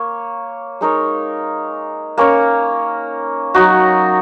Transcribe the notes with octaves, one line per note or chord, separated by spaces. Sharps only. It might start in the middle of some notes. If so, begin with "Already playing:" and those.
Already playing: A#3 C#5
G#3 D#4 A#4 C#5
A#3 C#4 A#4 C#5
F#3 D#4 F#4